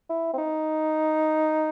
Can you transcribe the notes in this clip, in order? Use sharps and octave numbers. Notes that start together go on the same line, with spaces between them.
E4
C4
D#4